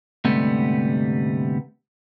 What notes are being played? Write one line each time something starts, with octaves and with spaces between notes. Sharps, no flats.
D2 G#2 C3 G3 A3 B3